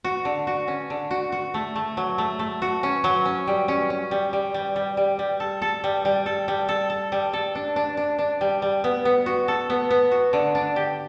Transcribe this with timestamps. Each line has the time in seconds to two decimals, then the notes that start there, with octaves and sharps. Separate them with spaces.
0.04 F#4
0.25 D3
0.47 F#4
0.68 C#4
0.90 D3
1.11 F#4
1.32 F#4
1.54 A3
1.76 A3
1.97 F#3
2.18 A3
2.39 A3
2.62 F#4
2.83 C#4
3.04 F#3
3.25 C#4
3.47 G3
3.68 C#4
3.90 C#4
4.11 G3
4.33 G3
4.54 G3
4.76 G3
4.97 G3
5.19 G3
5.40 A4
5.62 A4
5.84 G3
6.05 G3
6.26 A4
6.48 G3
6.69 A4
6.90 A4
7.12 G3
7.33 A4
7.55 D4
7.76 D4
7.97 D4
8.19 D4
8.41 G3
8.62 G3
8.84 B3
9.05 B3
9.26 F#4
9.48 A4
9.70 B3
9.91 B3
10.12 F#4
10.33 D3
10.55 D4
10.76 G4